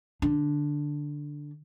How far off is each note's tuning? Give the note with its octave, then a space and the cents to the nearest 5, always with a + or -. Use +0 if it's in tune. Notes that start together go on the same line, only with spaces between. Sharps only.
D3 +0 D4 +0